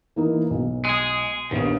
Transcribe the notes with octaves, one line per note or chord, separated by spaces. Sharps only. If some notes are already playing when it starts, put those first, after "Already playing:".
E3 A#3 D#4
B1
G#3 G#4
A#1 D#2 C#3 B3